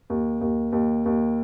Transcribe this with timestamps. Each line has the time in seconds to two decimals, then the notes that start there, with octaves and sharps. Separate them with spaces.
0.10 D#2
0.41 D#2
0.73 D#2
1.06 D#2